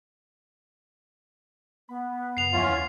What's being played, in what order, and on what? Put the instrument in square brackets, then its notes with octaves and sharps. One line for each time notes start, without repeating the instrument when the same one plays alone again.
[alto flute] B3 [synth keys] B5
[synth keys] F#2 C#3 [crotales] C7 F7
[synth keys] D#2 F3 F#5 [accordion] E3 C#4 F4